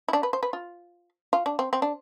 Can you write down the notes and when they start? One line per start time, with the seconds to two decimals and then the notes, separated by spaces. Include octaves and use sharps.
0.08 E4
0.13 D4
0.23 B4
0.33 C5
0.43 B4
0.53 F4
1.33 F4
1.46 D4
1.59 C4
1.73 C4
1.82 D4